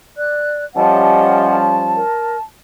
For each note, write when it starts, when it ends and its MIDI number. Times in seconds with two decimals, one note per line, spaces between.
0.18 0.64 74
0.18 0.64 90
0.76 2.01 53
0.76 2.01 55
0.76 2.01 61
0.76 1.57 67
0.76 1.57 75
0.76 1.57 78
0.76 2.41 81
1.95 2.36 70